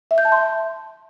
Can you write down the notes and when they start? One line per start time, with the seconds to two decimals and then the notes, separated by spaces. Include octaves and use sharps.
0.11 E5
0.18 G6
0.25 A5
0.32 C6